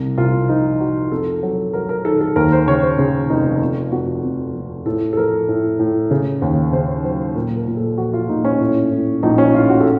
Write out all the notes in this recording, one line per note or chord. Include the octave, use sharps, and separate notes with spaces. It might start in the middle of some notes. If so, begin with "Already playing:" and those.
Already playing: C2
C2 F4
F3 D#4
F3 F#4
F2 A4
F#3 A4
F#3 A#4
A#4
D#3 A4
A4
D#2 A#4
C5
C#3 C#5
C5
C#3
F1 D#4
F2 F4
F2 F#4
F2
F2
A2 A4
A4
F3 A#4
A2
A2
C#3
D#2
C#3 C5
F#3 C5
A#2 A#4
A#4
A#2
A4
F3 F#4
F4
A#2 D#4
C#4
A2
A2
A#1 D#4
C#4
A2 F4
F#4
A4